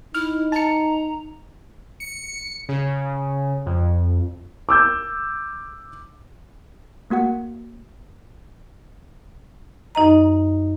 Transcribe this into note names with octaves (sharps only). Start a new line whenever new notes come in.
D#4 E4 F6
A5 A#5 C#7
C#7
C#3
F2
D6 E6 G6
A3 A#3 F#4 F#5
F#2 D#4 D#5 A#5